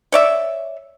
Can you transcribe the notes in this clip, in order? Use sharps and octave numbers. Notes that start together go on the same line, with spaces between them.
C#5 D5 E5